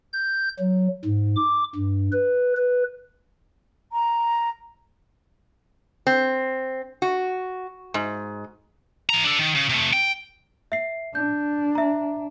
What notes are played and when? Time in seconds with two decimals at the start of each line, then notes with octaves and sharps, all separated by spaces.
0.13 G6
0.59 F#3
1.05 G#2
1.36 D6
1.75 G2
2.13 B4
2.57 B4
3.92 A#5
6.07 C4
7.02 F#4
7.94 G#2
9.09 E3 A#5
9.24 D4 A4
9.39 D#3
9.55 C#3
9.70 C3 A3
9.93 G5
10.72 E5 C7
11.15 D4 G6
11.75 E5 A#5